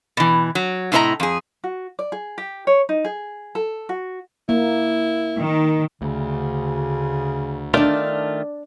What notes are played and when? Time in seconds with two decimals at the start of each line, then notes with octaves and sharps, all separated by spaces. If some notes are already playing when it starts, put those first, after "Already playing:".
0.17 B2 E3
0.55 F#3
0.92 A2 C3 E4 C5 D#5 A#5
1.20 F2 G#4
1.64 F#4
1.99 D5
2.12 G#4
2.38 G4
2.67 C#5
2.89 D#4
3.05 G#4
3.55 A4
3.89 F#4
4.49 A#3 E4
5.38 D#3
6.02 D2 C#3
7.74 D#3 A3 D4 F4 D5